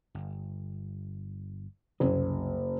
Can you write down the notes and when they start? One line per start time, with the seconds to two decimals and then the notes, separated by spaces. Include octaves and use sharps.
0.15 G1
2.00 F#1 C2 C3 F#3